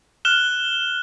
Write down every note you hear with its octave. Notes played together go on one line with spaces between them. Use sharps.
F6 F#6 E7 G7